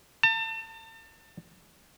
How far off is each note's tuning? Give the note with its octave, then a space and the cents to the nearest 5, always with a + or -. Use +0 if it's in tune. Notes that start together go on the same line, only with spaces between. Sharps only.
A5 +40